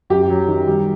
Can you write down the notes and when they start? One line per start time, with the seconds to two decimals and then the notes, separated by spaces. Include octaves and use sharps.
0.10 F#2 G4
0.29 F#3
0.47 D#3
0.67 G3